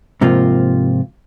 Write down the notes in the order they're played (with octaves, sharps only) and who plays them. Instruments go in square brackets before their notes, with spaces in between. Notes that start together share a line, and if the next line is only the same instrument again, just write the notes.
[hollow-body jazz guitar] G#2 C3 F3 A#3 F4